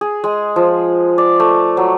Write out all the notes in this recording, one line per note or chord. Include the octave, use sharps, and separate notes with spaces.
G#4
G#3
F3
D5
A3
F#3